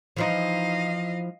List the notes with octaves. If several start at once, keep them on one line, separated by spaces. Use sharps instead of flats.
E3 F3 D#4 D#5 F5